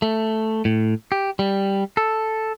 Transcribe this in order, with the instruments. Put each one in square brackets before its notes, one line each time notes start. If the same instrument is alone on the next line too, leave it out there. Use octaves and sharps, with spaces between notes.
[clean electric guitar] A3
A2
G4
G3
A4